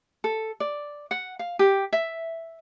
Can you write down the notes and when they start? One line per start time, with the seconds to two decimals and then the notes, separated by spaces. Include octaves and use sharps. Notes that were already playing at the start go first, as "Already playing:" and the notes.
0.24 A4
0.60 D5
1.11 F#5
1.39 F5
1.59 G4
1.93 E5